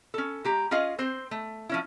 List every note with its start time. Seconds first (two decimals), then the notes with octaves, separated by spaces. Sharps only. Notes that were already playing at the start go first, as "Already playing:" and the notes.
0.14 C#4 A4
0.44 G#3 G4 A#5
0.71 C#4 F4 G#4 D#5 F5
0.99 C4 C5
1.31 A3
1.69 F3 C#4 E4